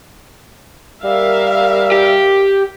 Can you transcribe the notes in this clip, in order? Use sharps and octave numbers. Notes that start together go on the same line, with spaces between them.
G3 A#4 E5 F5
G4